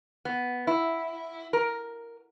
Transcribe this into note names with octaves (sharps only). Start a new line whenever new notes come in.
B3
E4
A#4